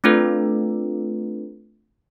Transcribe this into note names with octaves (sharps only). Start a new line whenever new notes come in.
A3 C4 D4 F4 A4 B4